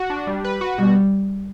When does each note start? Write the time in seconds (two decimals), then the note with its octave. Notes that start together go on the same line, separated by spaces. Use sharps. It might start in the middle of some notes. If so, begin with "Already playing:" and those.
Already playing: F#4
0.10 D4
0.27 G3
0.44 B4
0.61 F#4
0.78 B2 G3